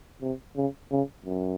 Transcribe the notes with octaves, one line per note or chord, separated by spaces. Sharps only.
C3
C#3
C#3
F#2